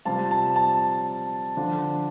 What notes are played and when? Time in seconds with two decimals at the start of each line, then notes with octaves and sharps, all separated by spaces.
0.05 C3 G3 C4 F4 A5
0.31 A5
0.56 A5
1.57 D3 F3 D4 F4